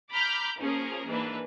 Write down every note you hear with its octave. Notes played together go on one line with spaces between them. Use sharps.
A#5 B5 D6 F6 G6
F3 A#3 C#4 G#4 A#4
G#2 E3 A#3 D4 B4